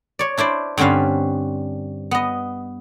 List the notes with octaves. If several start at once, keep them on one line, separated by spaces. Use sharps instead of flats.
C#5 D5
D4 E4 C5 D5
G2 D3 C4 C#4 B4 F5
B3 D#5